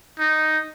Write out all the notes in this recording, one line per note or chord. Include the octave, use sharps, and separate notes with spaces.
D#4